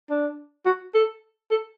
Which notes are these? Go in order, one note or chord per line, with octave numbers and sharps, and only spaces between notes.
D4
F#4
A4
A4